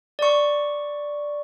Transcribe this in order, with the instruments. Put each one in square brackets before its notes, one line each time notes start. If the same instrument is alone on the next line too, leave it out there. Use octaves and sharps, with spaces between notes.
[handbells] D5 C#6